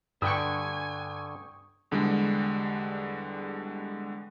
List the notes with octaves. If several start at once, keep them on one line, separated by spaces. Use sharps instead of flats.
G2 D3 B4 G5 G#5 C#6 D#6
E2 D3 G3 G#3